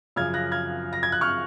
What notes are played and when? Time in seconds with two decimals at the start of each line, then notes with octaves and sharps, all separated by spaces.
0.16 F#2 C#3 F3 F6 G#6
0.34 F#6 A#6
0.51 F6 G#6
0.93 A#6
1.03 G#6
1.12 F#6
1.21 C#6 F6